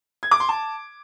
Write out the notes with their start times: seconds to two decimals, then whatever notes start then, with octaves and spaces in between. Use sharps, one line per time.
0.23 G#6
0.31 D6
0.40 C6
0.49 A5